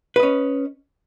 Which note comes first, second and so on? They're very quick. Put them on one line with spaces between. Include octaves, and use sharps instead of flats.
B4 D#5 C#4